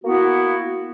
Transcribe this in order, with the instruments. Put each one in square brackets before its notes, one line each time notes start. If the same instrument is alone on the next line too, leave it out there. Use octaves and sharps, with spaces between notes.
[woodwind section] A#3 B3 E4 F#4